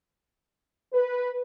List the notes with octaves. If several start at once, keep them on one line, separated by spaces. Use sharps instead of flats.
B4